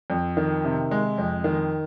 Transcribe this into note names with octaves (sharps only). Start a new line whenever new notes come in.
F2
D#3
C3
G#3
F2
D#3